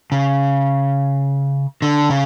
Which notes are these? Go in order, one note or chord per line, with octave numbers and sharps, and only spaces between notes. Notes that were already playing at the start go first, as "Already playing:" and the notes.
C#3
D3
C#3